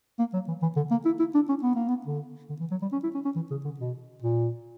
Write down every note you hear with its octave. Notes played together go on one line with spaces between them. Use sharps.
A#3
F#3
E3
E3
D3
A#3
E4
E4
D4
C#4
B3
A#3
B3
D3
D3
E3
F#3
G3
C#4
E4
C#4
C#4
E3
C#3
D3
B2
A#2